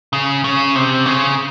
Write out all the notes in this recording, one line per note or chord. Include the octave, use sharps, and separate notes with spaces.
C#3
C#3
C3
C#3